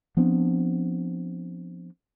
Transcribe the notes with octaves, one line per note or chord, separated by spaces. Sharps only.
F3 B3 C4 D4